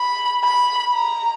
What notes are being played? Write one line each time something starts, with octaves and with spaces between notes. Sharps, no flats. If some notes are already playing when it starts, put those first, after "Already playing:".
Already playing: B5
B5
A#5